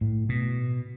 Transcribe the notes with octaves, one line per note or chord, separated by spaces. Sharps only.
A2
B2